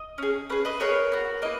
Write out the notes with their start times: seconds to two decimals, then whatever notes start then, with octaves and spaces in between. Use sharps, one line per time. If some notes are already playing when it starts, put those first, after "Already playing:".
Already playing: D#5
0.18 C#4 G#4
0.50 C#4 G#4 B4
0.65 B4 D#5
0.80 B3 D#4 G#4 A#4 C#5
1.12 B3 F#4
1.42 A#3 E4 B4 D#5